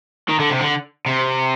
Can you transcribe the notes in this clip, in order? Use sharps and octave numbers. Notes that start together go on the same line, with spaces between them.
D#3
D3
C3
D3
C3